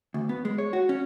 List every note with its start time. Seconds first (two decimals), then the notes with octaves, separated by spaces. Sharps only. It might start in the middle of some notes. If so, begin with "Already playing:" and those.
0.14 D2
0.29 B3
0.45 G#3
0.58 C#5
0.73 F#4
0.89 C#4